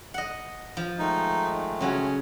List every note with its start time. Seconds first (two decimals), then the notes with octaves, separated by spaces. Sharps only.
0.14 D#5 F#5
0.77 F3
0.99 D#3 G#3 A3 D#4
1.81 C#3 F#3 C#4